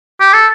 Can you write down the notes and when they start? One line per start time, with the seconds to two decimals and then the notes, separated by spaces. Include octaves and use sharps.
0.21 G4
0.34 A4